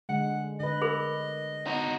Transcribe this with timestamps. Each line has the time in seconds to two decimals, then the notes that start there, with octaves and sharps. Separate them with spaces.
0.09 D3 G#3 F#5
0.60 D3 B4 D#5
0.81 G#4 A#4 B5
1.67 D#4 F#4